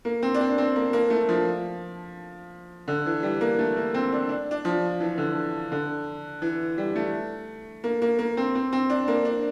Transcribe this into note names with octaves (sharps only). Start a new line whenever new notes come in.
A#3
C4
D4
C4
C4
A#3
A#3
A3
F3
D3
E3
G3
A#3
A3
A#3
C4
D4
D4
D4
F3
E3
D3
D3
E3
G3
A3
A#3
A#3
A#3
C4
C4
C4
D4
A#3
D4